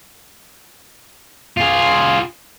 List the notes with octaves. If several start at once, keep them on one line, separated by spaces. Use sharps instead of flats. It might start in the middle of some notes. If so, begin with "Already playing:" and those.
F4 G#4